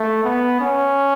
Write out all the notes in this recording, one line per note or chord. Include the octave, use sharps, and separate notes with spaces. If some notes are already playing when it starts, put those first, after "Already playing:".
Already playing: A3
B3
C#4